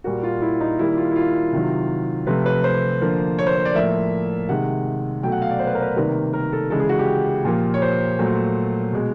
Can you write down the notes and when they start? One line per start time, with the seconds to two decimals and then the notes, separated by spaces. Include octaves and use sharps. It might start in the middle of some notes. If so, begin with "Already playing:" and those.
0.04 A#2 G3 A#3 F#4
0.23 F4
0.42 E4
0.60 D#4
0.78 D#3 G3 A#3 E4
0.97 F4
1.11 E4
1.16 F4
1.53 C3 D#3 F#3
2.27 C3 F3 A3 B4
2.46 B4
2.64 C5
3.01 D3 F3 A#3
3.38 C#5
3.47 C5
3.56 C#5
3.65 D5
3.75 A2 F3 A#3 E5
4.49 C3 D#3 G#3 F#5
5.23 B2 F#3 A3 G5
5.32 F#5
5.42 F5
5.51 D5
5.59 C5
5.67 B4
5.75 A#4
5.82 B4
5.96 C3 D#3 G3 A#3
6.33 A#4
6.52 A4
6.70 C#3 E3 G#3 A4
6.80 G#4
6.89 F#4
6.99 G4
7.45 A#2 F3 A#3
7.74 C#5
7.82 C5
8.19 A#2 F#3 A3
8.93 B2 G#3